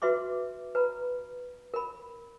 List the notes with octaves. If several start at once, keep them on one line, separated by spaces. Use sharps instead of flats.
F#4 B4 E5 C6 D6
B4 A#5 B5
A#4 B5